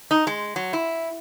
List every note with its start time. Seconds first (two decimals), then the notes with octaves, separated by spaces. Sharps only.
0.11 D#4
0.27 G#3
0.56 F#3
0.73 E4